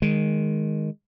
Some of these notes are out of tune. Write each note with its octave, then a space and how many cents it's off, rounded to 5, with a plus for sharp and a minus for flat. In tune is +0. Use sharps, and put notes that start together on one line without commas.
D#3 +0 G#3 +0